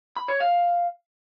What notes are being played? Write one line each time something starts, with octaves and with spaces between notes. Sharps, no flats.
B5
C#5
F5